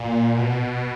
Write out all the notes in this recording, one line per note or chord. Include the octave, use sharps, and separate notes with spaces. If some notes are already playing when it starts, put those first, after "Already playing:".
Already playing: A#2
B2